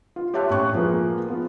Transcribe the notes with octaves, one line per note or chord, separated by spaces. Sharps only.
F4
G4 C#5 E5 A5 C6 F#6
A2 C#4 G5 C#6 F#6
F3 G#3 A#3 B4
B3 F4